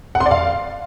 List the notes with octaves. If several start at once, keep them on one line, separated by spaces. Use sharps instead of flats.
F#5
C6
D5
F5